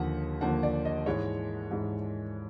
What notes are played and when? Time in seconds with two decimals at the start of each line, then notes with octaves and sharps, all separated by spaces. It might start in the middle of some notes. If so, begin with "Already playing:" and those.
Already playing: D#2 D3 F3 A#3 F#5
0.41 D#2 D3 F3 A#3 F#5
0.63 D5
0.85 D#5
1.06 G#2 E3 G#3 C#5
1.71 G#2 E3 G#3